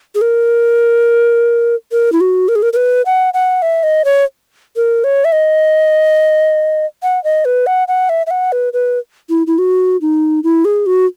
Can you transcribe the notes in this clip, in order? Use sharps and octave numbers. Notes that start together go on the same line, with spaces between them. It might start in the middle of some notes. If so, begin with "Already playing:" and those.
G#4
A#4
A#4
E4
F#4
A#4
G#4
A#4
A#4
B4
F#5
F#5
E5
D#5
C#5
A#4
C#5
E5
D#5
F#5
D#5
B4
F#5
F#5
E5
E5
F#5
B4
B4
E4
E4
F#4
D#4
E4
G#4
F#4